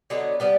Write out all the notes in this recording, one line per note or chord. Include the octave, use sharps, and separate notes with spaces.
D3 F#3 B3 D#4
G3 B3 D4 G4